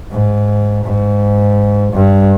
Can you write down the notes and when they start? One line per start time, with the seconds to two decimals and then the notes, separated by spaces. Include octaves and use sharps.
0.11 G#2
0.85 G#2
1.93 G2